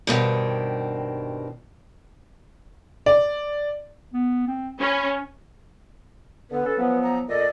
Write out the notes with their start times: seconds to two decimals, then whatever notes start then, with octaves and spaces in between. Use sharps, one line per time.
0.07 G2 B2 D#3 C4
3.06 D5
4.14 B3
4.47 C4
4.80 C#4 B5
6.51 D3 B3 B4
6.65 C#4 A4
6.78 F3 F#3 B3
7.03 A#5
7.29 A#2 A4 D5 D#5